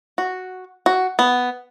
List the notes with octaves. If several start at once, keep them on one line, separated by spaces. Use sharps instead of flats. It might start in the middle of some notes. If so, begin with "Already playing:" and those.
F#4
F#4
B3